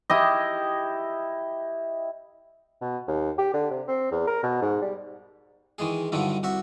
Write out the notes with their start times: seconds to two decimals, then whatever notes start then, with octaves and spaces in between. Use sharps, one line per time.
0.10 E4 G4 D#5
2.81 B2
3.07 D#2
3.38 G4
3.54 D3
3.71 C3
3.88 C4
4.12 E2
4.27 A#4
4.43 B2
4.61 G#2
4.82 G3
5.78 D#3 E3 G#3 G#4
6.12 G2 D3 D#3 F#3 E4
6.43 C2 F#4 E5